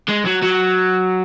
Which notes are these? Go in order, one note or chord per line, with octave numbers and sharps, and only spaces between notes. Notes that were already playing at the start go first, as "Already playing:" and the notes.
G#3
F#3
F#3